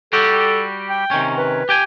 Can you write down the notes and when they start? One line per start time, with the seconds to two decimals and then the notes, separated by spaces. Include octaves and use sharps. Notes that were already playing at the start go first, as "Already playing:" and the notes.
0.13 G3 F#4 G4 A4
0.90 G5
1.11 C3 D#3 C#4
1.38 B4
1.69 G4 G5 G#5